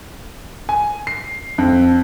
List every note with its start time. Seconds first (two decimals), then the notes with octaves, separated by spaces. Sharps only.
0.69 G#5
1.07 C7
1.58 F2